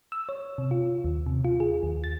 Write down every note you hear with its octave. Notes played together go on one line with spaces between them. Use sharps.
E6
C#5
C3
F4
D#2
C3
F4
G#4
D#2
A6